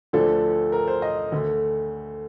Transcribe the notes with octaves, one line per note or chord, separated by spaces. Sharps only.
D2 D3 F3 A3 D4 A4
A#4
C5
D#5
D2 D3 A3